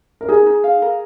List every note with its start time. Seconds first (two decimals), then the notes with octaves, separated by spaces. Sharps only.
0.21 A#4
0.28 D#4 G#4
0.46 D#4
0.64 F5
0.82 A#4